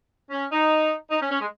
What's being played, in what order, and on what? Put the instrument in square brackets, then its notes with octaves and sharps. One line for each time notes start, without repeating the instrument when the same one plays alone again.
[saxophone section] C#4
D#4
D#4
C#4
C#4
G#3